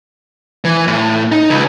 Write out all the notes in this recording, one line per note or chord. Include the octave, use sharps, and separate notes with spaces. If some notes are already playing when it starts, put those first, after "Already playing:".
E3
A2
D#4
C#2